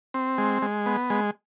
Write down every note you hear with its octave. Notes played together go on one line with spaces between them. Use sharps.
C4
G#3
G#3
B3
G#3